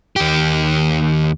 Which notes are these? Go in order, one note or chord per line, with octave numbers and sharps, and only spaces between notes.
D#2 G4